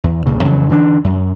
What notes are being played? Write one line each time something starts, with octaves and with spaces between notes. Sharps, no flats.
E2
C2 G2 A#2 C#3
F2 C#3 E3 F#3
D3 E3 A3 D4
F#2